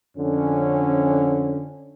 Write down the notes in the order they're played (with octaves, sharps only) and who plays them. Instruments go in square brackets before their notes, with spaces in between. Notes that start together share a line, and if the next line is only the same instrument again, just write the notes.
[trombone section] F2 D3 C#4